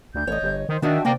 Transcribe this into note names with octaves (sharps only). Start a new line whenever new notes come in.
D2 G6
A1 C#5 D#5
G1
D#3 C5
D#3 D4 F#4 D#5 E5 G5 A5
D2 C3 A#3 D5 G5